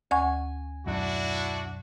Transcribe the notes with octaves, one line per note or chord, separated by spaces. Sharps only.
D2 F#5 G#5 C#6
B1 F#2 D4 E4 F#4